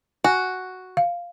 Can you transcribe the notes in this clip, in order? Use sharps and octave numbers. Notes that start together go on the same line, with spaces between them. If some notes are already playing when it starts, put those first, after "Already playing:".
F#4 G#5
F5